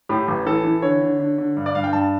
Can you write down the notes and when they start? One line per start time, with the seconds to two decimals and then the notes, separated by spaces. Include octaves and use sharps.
0.09 A2 G4
0.28 A1
0.46 E3 A4
0.64 E3
0.82 D3 C#5
1.01 D3
1.20 D3
1.38 D3
1.57 G2
1.66 D5
1.75 G2 F5
1.84 G5
1.93 G2 A5